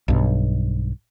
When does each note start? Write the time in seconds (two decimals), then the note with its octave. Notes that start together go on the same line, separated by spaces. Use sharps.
0.08 B1 G2